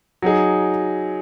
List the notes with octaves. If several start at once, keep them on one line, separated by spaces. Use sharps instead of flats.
F#3 D#4 G#4